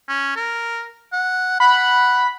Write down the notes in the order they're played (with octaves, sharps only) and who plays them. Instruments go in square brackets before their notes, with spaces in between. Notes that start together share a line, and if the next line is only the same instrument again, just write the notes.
[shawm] C#4
A#4
F#5
[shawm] F#5 [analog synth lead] B5